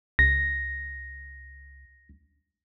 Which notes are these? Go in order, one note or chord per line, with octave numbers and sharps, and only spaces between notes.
C#2 A#6